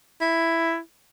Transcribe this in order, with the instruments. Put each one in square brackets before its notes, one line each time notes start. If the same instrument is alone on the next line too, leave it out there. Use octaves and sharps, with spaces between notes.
[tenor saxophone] E4